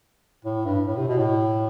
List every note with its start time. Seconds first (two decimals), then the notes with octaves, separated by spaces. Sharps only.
0.45 A2
0.65 G2
0.87 A2
0.97 C3
1.08 B2
1.18 A2